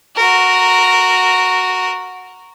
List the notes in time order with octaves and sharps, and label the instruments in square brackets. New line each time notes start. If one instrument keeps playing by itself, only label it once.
[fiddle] F#4 A#4